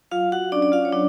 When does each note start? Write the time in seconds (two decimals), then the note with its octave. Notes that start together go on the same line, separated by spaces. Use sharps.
0.11 F#3 F4 F5
0.32 F#4 F#5
0.52 C#4 D4 D5
0.62 D5
0.72 F4 F5
0.85 C#5
0.92 F#3 D4 D5